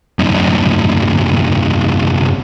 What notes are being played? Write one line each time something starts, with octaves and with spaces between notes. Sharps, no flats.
C2 F#2